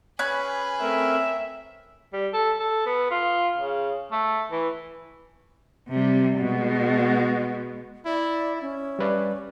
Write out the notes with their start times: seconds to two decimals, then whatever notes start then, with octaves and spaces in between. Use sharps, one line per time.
0.19 C#4 G#4 B4 B5 F#6
0.81 A3 C4 A#4 E5
2.13 G3
2.34 A4
2.60 A4
2.86 B3
3.11 F4
3.57 C#3
4.12 A3
4.52 E3
5.89 C3 G3
6.39 B2 G#3
8.06 E4 D5
8.61 C#4 E5
8.99 G3 B4 D5